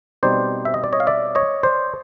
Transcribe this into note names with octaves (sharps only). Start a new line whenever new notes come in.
B2 G3 C4 D#4 C5 D5
E5
D#5
D5
C#5 D#5
F5
D5 E5
C#5 D#5
C5 D5